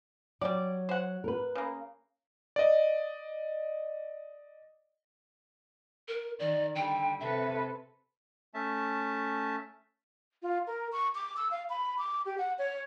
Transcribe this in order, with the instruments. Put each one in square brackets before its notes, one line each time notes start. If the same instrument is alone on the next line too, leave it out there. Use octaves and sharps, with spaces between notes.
[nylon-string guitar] F#3 [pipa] G3 D5
[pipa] C5 F#5
[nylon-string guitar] A#4 B4
[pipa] C#3 A#3
[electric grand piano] D5 D#5
[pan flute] A#4
[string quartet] D#3 [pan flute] D5
[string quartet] D3 G3 [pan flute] G5
[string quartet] C3 A4 B4 [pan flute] E5
[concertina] A3 C#4 E5 A5
[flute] F4
A#4
C#6
D6
E6
F5
B5
D6
G4
F#5
C#5